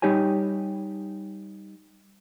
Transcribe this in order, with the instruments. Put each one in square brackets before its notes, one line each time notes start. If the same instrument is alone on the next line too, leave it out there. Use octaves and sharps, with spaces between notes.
[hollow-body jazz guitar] G3 D#4 G4 C#5 G#5